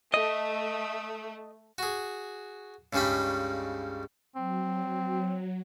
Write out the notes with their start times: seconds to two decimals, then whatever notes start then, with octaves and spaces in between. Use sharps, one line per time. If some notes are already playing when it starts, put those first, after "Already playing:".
0.14 A3 D#5
1.78 F#4 G#4
2.93 C#2 G2 C#3 G3 D#4 B5
4.36 F#3 C4